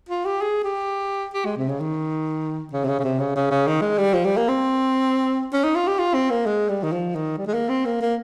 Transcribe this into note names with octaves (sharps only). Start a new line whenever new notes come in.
F4
G4
G#4
G4
G4
G#3
C3
C#3
D#3
C#3
C3
C#3
C#3
C3
C#3
C#3
C#3
D#3
G#3
G3
F3
G3
A#3
C4
C#4
D#4
F4
G4
F4
C4
A#3
G#3
G3
D#3
F3
D#3
G3
G#3
A#3
C4
A#3
A#3